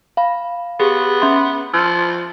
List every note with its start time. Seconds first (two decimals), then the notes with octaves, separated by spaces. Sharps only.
0.17 F5 B5
0.80 B3 G4 G#4
1.22 C#4 E5 C6
1.74 F3 E6 F6